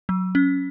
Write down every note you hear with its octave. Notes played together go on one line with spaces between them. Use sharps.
F#3
C#4